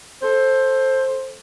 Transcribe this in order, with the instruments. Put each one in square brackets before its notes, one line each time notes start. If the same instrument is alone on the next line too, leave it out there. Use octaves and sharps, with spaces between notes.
[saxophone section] A4 C5